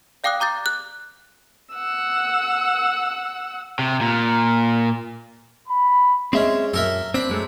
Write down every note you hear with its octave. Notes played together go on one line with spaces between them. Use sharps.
D5 F5 G5 D6 D#6 F#6
A#5 D6 G6 A6
F#6
F#5 E6
C3
A#2
B5
G#3 C4 C#4 E5
F#2 A4 A#4 E5
C4 D4 B5
F#2 G#3 A3